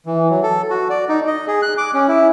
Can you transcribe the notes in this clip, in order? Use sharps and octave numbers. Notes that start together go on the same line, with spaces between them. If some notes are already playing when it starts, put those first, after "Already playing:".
E3
F#3
A4
F#4
D5
D#4
D#5
G#4
F#6
D6
C#4
E4